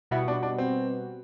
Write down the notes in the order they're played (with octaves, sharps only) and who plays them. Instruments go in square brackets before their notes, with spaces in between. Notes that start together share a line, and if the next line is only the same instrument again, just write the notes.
[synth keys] B2 G3 B3 F#4 [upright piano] E4
[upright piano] D4
D4
C4